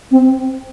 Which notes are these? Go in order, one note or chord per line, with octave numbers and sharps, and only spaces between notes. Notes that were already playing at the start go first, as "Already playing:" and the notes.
C4